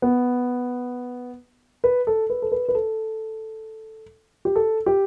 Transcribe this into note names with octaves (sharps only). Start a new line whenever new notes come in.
B3
B4
A4
B4
A4
B4
B4
A4
G4
A4
G4